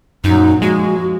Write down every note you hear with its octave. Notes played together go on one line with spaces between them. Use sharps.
F#2 A#2 F#3 D#4
F3 G#3 F#4